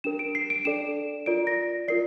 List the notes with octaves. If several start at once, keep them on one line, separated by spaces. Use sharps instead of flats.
D4 G4 A#4 E7
D7
C7
D7
D4 A4 D5 E7
F4 A#4 D5 D7
A#6
F4 A#4 D5 C7